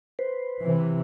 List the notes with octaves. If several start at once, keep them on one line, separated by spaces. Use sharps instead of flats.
B4 C5
C3 E3